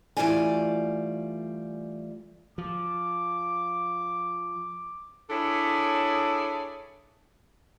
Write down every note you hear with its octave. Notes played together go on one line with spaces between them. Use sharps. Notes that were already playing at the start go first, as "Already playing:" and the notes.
E3 G3 A3 F4 D5 G#5
F3 D6
D4 E4 G#4 A4 C#5